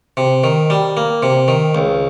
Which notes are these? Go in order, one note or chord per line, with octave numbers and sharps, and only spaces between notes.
C3
D#3
G3
A#3
C3
D#3
C#2